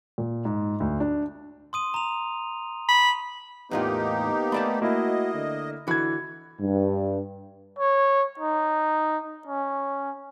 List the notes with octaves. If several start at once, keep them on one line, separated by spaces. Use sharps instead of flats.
A#2
G#2
D2
D4
C6 D#6 D#7
A#5 F7
B5
E2 A2 A#3 B3 D#4 F4 G4
A3 D5 A5 B5
A#3 E4 F#4 D#5
D3
D3 E3 F#4 G#6
G2
C#5
D#4
C#4